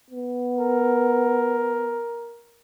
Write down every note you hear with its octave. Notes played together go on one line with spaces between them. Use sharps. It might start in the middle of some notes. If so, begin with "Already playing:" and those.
B3
A#4